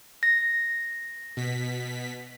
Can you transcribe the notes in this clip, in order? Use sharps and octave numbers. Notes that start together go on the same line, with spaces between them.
A#6
B2 B6